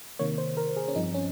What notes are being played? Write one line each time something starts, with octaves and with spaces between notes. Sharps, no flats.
C3 D#3 A#3 C#5
C5
A#4
G#4
C#4
G2 F3 C4 D#4
C#4